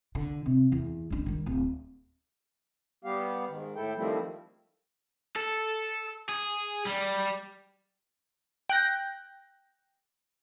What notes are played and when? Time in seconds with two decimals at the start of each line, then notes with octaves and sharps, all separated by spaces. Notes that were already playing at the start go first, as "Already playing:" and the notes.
0.15 D3
0.46 C3
0.72 E2
1.10 C#2 D4
1.26 D#3 G3
1.46 D1
3.04 G3 B3 G4 F5
3.49 G#2 D#3
3.76 A2 E4 A4 G5
3.97 D#3 F3 G3 A3 C4 E4
5.36 A4
6.29 G#4
6.86 G3
8.70 G5 F#6 G6 A#6